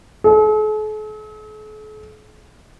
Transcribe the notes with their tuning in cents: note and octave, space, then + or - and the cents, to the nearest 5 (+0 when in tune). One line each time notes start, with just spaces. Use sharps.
A4 -45